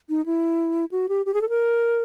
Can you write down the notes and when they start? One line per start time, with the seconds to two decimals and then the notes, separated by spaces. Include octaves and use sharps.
0.09 D#4
0.26 E4
0.92 F#4
1.09 G4
1.26 G4
1.34 G#4
1.41 A4
1.49 A#4